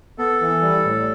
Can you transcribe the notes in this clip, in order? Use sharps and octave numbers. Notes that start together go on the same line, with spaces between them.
B3 A4
E3
G3
A2